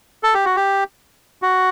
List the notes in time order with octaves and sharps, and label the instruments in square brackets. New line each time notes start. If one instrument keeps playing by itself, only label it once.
[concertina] A4
G4
F#4
G4
F#4